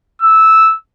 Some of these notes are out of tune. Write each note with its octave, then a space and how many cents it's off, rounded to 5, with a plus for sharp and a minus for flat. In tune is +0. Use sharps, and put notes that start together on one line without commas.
E6 -10